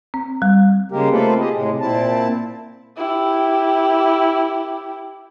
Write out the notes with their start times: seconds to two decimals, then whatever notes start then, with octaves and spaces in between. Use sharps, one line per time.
0.14 C4
0.42 G3
0.92 C#3 G#3 A#3 G4 A#4
1.11 A3 A#3 C4 F4 A4 B4
1.40 G4 G#4 D#5
1.54 A2 C3 G#3
1.80 A#2 C4 E4 A5
2.97 E4 G4